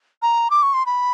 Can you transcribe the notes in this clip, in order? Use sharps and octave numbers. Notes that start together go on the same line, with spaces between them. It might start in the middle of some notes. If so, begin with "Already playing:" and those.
A#5
D6
C#6
C6
B5